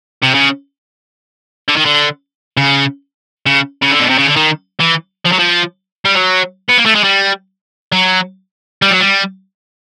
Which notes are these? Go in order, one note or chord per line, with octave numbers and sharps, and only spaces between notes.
C3
C#3
D3
D#3
D3
C#3
C#3
C#3
D3
B2
C3
C#3
D3
D#3
E3
F3
F#3
F3
G3
F#3
B3
A#3
A3
G#3
G3
F#3
G3
F#3
G3